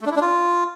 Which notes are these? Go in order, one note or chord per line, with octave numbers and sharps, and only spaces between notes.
A3
D4
E4
D4
F4